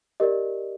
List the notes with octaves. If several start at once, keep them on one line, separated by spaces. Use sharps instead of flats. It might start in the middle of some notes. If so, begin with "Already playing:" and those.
G4 A#4 D5 D#5